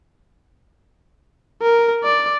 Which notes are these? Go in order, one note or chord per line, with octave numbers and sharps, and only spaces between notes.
A#4
D5